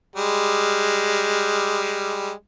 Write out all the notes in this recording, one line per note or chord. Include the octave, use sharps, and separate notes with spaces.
G3 G#3